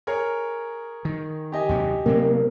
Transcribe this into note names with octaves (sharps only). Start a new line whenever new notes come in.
G#4 A#4 C#5
D#3
G4 D#5 G#5
D#2 C3 F#3
C3 F#3 A#3 C4